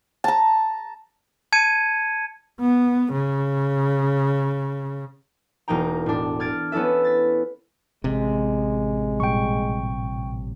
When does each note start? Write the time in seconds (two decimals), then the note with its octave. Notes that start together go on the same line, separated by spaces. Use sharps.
0.24 A5 A#5
1.52 A5 G#6 C#7 D#7
2.61 B3
3.13 C#3
5.68 E1 A#3 D#4 G5 A#5
6.06 A2 D4
6.40 F6 G#6 A6 D7
6.72 B3 C#4 E4 A4 E5
7.04 A6 B6
8.04 A1 C3 G#3
9.20 A#2 G3 G5 C#6